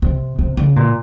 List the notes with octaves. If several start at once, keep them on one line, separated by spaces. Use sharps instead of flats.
C3
C3
C#3
A#2